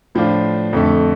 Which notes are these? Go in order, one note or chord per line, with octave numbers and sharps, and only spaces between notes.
A2 F3 D4 F4 C5
F2 D3 A3